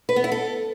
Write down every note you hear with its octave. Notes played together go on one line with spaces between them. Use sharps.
B4
B3
E4
A4